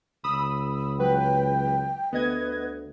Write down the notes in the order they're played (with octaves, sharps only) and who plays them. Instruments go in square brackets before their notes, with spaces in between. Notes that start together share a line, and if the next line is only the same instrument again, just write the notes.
[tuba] C#2 [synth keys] B5 D#6 E6
[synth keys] F#3 B4 [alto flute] G5
[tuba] D2 [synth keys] B3 D#5 G#6 [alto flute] B4